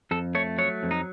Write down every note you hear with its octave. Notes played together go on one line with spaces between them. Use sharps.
F2 A4
A3 C#5
F#3 C#5
F2
D#4